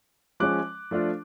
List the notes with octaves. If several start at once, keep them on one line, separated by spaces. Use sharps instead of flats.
F3 G#3 C#4 D6 F#6
F3 A3 D4 F4